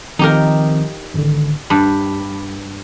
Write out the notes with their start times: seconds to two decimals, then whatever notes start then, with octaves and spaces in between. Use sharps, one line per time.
0.19 D#3 F3 C4 D#4 G4 A#4
1.14 G#1 D3
1.70 G2 B5 D6